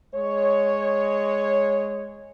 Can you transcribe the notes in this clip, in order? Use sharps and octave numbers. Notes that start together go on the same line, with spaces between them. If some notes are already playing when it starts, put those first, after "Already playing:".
G#3 C#5